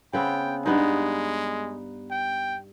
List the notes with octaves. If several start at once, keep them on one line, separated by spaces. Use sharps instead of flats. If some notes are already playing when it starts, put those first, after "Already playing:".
C#3 B3 C4 G5
G2 G#3 B3 D#4
G5